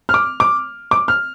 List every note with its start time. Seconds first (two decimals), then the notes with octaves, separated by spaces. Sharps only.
0.09 F6
0.14 D6
0.40 D6
0.91 D6
1.08 F6